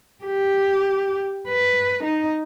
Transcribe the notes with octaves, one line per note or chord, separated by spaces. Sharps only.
G4
B4
D#4